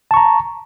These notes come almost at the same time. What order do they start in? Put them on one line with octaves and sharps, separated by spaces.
A5 C#6 A#5